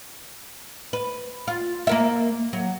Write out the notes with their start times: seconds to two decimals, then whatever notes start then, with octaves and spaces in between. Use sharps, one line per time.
0.93 B4
1.48 F4
1.87 A#3 A#4 E5
2.53 F#3